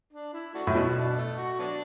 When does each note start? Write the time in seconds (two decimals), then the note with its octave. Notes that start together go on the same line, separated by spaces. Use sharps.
0.13 D4
0.33 E4
0.54 A3 D4 F#4
0.67 A2
0.75 B2 B3 E4
0.96 D4
1.18 A3
1.37 F#4
1.59 F#3 B3 D4